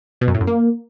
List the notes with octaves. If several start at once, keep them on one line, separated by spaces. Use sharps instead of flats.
B2
F#2
A2
F#2
A#3